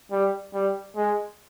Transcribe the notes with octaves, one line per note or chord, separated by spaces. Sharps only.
G3
G3
G#3